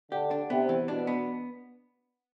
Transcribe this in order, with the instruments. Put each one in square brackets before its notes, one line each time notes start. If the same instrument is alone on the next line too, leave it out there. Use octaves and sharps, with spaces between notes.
[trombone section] D3 [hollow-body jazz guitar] G4
[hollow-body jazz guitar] D4
[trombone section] C3 [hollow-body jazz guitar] B3
[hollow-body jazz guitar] E3
[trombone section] B2 [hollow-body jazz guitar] D4
[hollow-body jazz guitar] B3